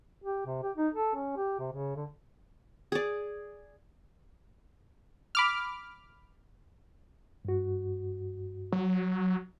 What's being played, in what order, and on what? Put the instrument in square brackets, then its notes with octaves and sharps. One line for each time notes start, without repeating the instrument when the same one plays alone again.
[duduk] G4
C3
G4
D#4
A4
C#4
G4
C3
C#3
D3
[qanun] G#4 D5
[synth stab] B5 D6 F6
[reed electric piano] G2 F#4
[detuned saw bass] F#3